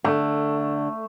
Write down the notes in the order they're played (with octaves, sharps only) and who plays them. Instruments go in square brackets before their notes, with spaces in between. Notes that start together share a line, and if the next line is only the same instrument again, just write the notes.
[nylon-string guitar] D3 [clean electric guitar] A3